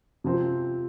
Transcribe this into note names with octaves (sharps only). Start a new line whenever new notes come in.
C3 F3 C4